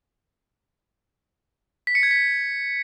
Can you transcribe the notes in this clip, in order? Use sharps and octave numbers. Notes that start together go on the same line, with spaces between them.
B6
C#7
G#6
B6